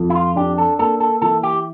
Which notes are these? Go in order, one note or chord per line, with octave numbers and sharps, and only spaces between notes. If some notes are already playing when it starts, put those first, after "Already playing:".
Already playing: F2
E4
F4
D4 G4
A4
A#3 A4
A4
E3 A4
G4